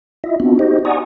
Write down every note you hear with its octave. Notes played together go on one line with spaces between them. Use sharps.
E4 F4 D#5 E5
B3 C4 D4 F4 F#4
D#4 F#4 G4 C5 D#5
D5 F#5 G#5 A#5 C#6 D#6